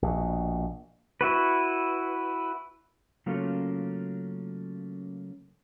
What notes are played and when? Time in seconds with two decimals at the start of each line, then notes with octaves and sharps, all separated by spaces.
0.02 A#1 B2
1.21 E4 F#4 B4
3.26 C#3 F#3 A3 A#3 C#4 F4